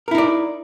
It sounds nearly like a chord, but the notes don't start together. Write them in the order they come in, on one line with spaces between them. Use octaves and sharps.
A#4 E4 D#4 D5